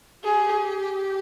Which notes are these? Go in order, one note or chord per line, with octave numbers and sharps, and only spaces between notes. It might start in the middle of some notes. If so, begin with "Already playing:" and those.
G4 G#4